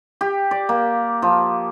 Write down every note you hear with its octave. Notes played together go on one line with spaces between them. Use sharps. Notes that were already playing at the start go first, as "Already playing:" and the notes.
G4
D5
A#3
F3